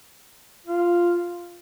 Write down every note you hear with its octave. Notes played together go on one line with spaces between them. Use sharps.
F4